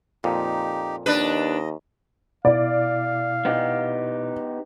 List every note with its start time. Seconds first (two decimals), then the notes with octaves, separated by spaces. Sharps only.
0.24 F2 A#2 D#4 G4
1.06 D#2 D4 B4 D#5
2.45 B2 E4 D5 F5
3.45 B3 D#4 G4